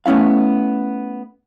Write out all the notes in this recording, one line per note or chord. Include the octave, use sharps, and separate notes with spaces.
A3 B3 C#4 E4 F5